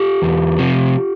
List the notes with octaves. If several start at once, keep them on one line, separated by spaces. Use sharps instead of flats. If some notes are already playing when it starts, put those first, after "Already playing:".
Already playing: F4 G4
E2
C3 F3